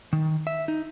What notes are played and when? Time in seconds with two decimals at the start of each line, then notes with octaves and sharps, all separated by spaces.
0.13 D#3
0.47 E5
0.68 D#4